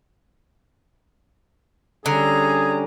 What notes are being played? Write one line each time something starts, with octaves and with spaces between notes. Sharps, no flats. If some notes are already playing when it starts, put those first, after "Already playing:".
D3 G3 C#4 G#4 A#5